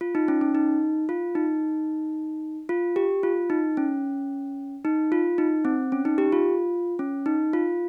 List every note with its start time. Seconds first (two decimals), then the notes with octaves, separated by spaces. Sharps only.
0.01 F4
0.15 D#4
0.28 C#4
0.41 C#4
0.55 D#4
1.09 F4
1.35 D#4
2.69 F4
2.96 G4
3.23 F4
3.50 D#4
3.77 C#4
4.85 D#4
5.12 F4
5.38 D#4
5.65 C4
5.92 C#4
6.05 D#4
6.18 G4
6.32 F4
6.99 C#4
7.26 D#4
7.53 F4